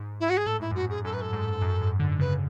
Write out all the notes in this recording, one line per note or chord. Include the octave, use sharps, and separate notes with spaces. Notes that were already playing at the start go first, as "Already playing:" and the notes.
Already playing: G#2
E4
F#4
G#4
A2 A4
G#2 E4
F#2
G#2 F#4
F#2 G#4
F#2 A4
B4
A4
G#2
F#2
G#2
D3
D3
C#3 B4